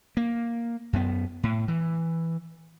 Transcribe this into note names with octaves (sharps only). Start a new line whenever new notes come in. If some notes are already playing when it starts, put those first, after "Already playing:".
A#3
F#2 B3
A2
E3